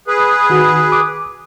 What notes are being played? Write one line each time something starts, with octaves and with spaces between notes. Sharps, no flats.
G#4 B4
D#3 F#4
D6